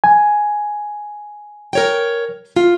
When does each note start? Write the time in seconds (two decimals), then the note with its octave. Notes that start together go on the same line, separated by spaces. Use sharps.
0.04 G#5
1.73 A#4 C#5 G5
2.56 F4